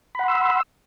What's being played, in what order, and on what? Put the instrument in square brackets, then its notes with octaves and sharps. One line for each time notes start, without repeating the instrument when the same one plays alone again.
[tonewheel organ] B5
F#5
C6
E6